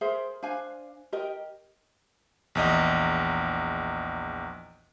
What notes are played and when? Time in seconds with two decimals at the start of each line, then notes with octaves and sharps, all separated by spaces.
0.01 G#4 A#4 C5 E5
0.43 D4 C5 F5 G#5
1.12 G4 A#4 D#5
2.55 A#1 E2 D#5